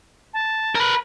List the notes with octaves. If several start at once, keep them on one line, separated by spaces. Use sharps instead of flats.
A5
A#4 B4